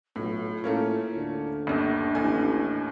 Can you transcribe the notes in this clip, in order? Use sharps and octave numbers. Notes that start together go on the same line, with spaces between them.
B1 A2 F4
A2 A3 A#3 C#4
D2
G1 D#2 D4
A1 D#2 A2 G#5